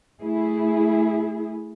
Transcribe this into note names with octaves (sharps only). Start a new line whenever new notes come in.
A3 E4 G#4